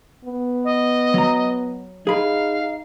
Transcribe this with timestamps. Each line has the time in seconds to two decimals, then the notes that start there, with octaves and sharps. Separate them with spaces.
0.25 B3
0.65 D#5
1.14 F#3 A#5
2.07 D#4 G#4 F5 B5